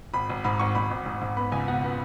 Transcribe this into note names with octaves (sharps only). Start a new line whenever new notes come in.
G#1 B5
G#1
G#2 B5
G#1 C#6
G#1 B5
G#1
G#2
G#2
B3 B5
C#2 G#5
B2 F#5
B3